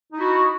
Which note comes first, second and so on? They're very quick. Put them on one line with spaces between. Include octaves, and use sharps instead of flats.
D#4 E4 F#4